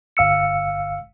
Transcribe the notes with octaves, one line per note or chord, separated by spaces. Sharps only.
G1 F5 E6 C#7